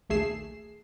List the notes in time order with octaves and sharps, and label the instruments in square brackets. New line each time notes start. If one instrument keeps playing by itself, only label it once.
[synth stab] A#1 D#2 A3 G#4 C7 E7